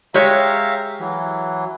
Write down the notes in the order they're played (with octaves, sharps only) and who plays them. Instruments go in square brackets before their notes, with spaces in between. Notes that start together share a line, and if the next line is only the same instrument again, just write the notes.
[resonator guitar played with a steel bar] G#3 G4 C#5 [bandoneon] E5 F5 A#5
[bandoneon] E3 F#3